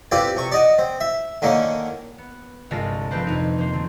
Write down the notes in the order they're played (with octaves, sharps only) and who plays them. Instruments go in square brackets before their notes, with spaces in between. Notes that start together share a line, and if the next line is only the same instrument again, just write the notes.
[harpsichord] C4 F4 G4 A4 B4 D5
C3 C#6
D5 D#5 F#5
C4
E5
D3 D#3 A#3 C#4
[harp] B3
G1 C2 G#3 F4 A5 A#6
F3 A3 C4 G4 B4 C5
F2 C3 D#4
F3 A#3 C5
D3 F#3 A3